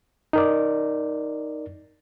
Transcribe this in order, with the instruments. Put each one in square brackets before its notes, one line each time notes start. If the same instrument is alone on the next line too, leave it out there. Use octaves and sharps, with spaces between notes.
[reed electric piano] D#4 A#4 D5